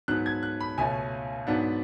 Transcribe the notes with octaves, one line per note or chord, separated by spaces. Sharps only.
G#2 F#3 B3 F#6
G#6
F#6
B5
C#2 B2 A3 C#4 G#5
G#2 F#3 B3 D4 F#5